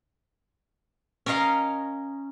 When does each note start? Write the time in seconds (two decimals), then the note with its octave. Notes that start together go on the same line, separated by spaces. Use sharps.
1.26 C#4 A#4 C#5 D#5 F5